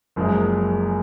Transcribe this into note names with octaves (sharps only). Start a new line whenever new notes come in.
F#1 F#2 F3 G#3